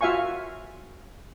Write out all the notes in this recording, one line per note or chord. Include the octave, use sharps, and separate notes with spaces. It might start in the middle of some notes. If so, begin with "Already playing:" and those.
F4 F#4 E5 F5 G#5 C#6